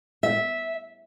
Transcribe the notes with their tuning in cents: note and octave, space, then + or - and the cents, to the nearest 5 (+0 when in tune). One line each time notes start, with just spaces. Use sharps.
E5 -10